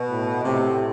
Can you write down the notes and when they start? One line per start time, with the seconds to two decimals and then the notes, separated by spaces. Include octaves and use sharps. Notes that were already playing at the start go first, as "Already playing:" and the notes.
Already playing: B2
0.10 A2
0.44 A2 C3